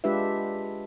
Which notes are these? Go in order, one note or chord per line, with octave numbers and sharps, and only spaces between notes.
G#3 D4 F4 G4 B4 E5